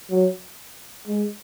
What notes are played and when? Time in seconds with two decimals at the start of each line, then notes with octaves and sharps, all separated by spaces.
0.10 F#3
1.07 G#3